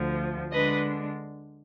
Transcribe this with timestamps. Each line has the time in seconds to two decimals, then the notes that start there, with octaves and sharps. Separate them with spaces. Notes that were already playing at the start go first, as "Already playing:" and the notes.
Already playing: D2 D3 F3
0.52 D3 G#3 D4 B4 D#5